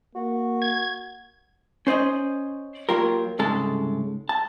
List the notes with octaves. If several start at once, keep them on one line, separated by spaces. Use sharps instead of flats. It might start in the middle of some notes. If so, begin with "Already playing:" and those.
A#3 F#4
G#6
C#4 C5 D5 D#5 C6
F#3 A#3 F4 G4 A#4
C2 G#2 C#3 G#3 A4 A5
A5